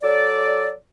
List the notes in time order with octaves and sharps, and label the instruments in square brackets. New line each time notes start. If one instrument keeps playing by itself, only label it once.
[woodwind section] F#3 A4 D5